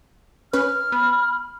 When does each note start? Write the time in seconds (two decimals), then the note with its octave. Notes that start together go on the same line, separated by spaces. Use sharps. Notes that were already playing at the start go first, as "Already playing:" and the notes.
0.53 C#4 B4 F6
0.92 B3 B5